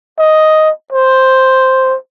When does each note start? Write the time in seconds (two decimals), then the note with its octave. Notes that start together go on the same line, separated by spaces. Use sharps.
0.19 D#5
0.92 C5